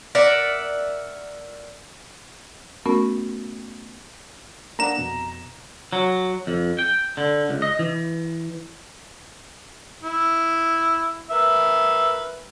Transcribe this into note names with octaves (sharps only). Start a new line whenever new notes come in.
A#4 D5 E5 F#5
A3 B3 C#4 F#4 A#4
A#3 D4 F#5 A#5 E7
F2 B2
F#3
F2
G5
D3
C#2
D#5
E3
E4
A#4 B4 E5